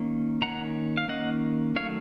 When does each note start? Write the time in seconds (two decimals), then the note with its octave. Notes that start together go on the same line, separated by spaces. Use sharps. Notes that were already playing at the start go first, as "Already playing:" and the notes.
Already playing: D#3 A#3 C#4
0.42 D#3 A#3 C#4 F#5 A#5
0.97 F5
1.08 D#3 A#3 C#4 D#5 F#5
1.75 D#3 F#3 A3 C#5 F5